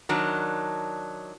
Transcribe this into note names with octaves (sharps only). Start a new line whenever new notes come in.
D#3 F#3 D4